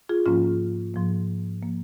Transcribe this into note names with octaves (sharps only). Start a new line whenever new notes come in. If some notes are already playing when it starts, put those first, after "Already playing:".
F4 G#4
G#2 F3 A#3 C#4 F4
G#2 F3 A#3
F3 A#3